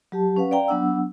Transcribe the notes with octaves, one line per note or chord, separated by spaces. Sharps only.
F#3 G4 A5
C#4 B4 F5 F#5
D5 F5 G5 A#5
F#3 B3 D4 F#5 E6